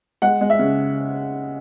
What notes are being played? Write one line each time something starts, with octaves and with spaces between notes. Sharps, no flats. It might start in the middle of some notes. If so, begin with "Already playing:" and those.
G#3 F#5
G#3
E5
C#3